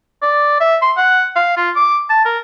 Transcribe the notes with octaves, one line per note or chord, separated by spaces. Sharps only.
D5
E5
C6
F#5
F5
F4
D6
A5
A#4